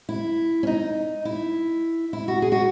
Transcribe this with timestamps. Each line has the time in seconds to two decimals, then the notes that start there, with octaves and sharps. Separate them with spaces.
0.09 E4
0.63 C#4
0.67 D#4
1.25 E4
2.13 E4
2.28 F#4
2.42 G#4
2.52 F#4